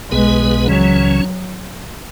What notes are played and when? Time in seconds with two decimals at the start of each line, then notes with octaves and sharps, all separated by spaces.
0.11 B1 B2 G#3 B3 G#4 B4
0.67 C#2 C#3 E3 F#3 C#4